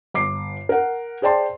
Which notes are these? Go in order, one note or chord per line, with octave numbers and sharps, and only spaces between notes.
G1 D6 C7
A#4 F#5
G#4 C5 D5 G5 A5 C6